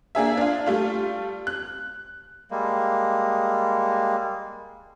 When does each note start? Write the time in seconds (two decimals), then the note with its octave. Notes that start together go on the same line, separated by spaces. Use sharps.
0.15 A#3 D4 G#4 E5
0.37 D4 F4
0.66 G3 A3 F4
1.47 F#6
2.51 G3 G#3 A#3